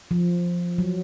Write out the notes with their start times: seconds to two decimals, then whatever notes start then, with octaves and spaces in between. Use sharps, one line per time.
0.11 F3
0.78 F#3